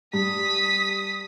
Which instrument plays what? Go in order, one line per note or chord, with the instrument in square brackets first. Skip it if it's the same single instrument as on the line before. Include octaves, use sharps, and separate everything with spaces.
[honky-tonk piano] G2 [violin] D#6 B6